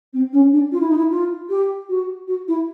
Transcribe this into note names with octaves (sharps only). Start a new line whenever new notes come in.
C4
C#4
D4
F4
E4
D#4
E4
F4
G4
F#4
F#4
E4